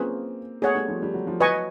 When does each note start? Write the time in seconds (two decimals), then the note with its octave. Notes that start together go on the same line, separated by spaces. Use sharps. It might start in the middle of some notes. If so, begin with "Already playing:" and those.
Already playing: A#3 C4 C#4 F4 G#4 B4
0.62 A3 B3 G#4 C#5 F#5
0.75 G3 A3
0.88 F3 G3
1.02 G3
1.14 F#3
1.27 F3
1.40 F#3 B4 D#5 G#5 C#6